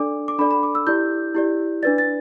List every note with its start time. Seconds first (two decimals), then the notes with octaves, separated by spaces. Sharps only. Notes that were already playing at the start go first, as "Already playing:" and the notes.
Already playing: D4 A4 D5 D6
0.28 D6
0.39 D4 A4 D5 B5
0.51 B5
0.63 D6
0.75 E6
0.87 E4 G4 D5 G6
1.35 E4 G4 D5
1.83 D4 B4 D5 A6
1.98 A6